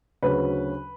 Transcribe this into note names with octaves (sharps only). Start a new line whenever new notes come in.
D2 C#3 F#3 C#4 B4